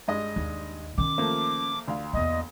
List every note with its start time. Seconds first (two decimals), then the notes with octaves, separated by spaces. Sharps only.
0.08 G2 G#3 D#5
0.36 D#2
0.98 D#3 C#4 D6
1.18 F3 A3 A#3
1.88 D2 F5
2.13 E2 A#3 D#5